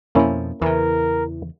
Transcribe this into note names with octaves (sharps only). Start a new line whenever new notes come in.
F2 B2 F3 A#3 C#4 E4
E2 C#3 E3 A#4